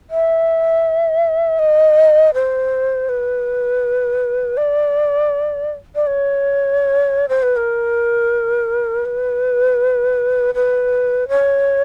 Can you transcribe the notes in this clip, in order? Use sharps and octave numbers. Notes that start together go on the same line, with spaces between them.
E5
D#5
C5
B4
D5
D5
C#5
C5
B4
A#4
B4
B4
C#5